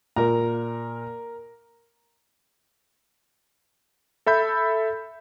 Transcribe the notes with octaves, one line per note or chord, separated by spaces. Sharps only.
A#2 A#4 A#5
A4 E5 B5 G6